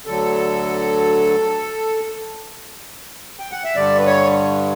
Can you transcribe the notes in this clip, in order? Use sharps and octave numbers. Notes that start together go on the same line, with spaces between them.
D2 D3 F#3 A4
G5
F#5
E5
G2 D3 G3 D5
B4
C#5